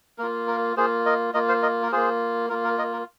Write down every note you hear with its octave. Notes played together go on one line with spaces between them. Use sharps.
A#3 F4 A#4
A#4
A#3 F4 G#4 C5
A#4 D#5
A#3 F4 A#4 D#5
C5 F5
A#4 D#5
A#4
A#3 F4 G#4 C5
A#3 F4 A#4
A#4
A#4 D#5
A#4